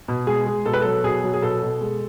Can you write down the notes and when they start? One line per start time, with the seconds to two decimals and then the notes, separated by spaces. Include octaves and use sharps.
0.08 B2
0.27 G#3 G#4
0.46 G#3
0.66 B2 A4
0.73 B4
0.81 F#3 A4
1.04 B2 G#4
1.24 F#3
1.34 G#4
1.42 B2 A4
1.62 B2
1.81 G#3